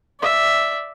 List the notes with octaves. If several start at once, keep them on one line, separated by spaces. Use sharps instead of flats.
D5 E5